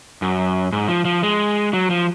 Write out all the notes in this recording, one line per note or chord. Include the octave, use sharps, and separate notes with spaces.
F#2
G#2
F3
F3
G#3
F#3
F3